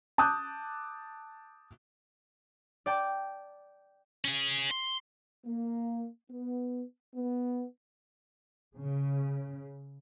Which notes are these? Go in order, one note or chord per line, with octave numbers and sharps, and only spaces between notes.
A5 D6 D#6 F#6 G6
D5 G5 A5
C#4 G#4
C6
A#3
B3
B3
C#3